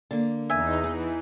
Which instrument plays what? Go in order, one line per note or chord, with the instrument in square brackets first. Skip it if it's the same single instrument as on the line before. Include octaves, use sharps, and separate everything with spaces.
[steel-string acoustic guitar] D3 A#3
[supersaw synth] E2 D#4 [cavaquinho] E5 G#5
[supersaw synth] E3 [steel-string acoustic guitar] G#4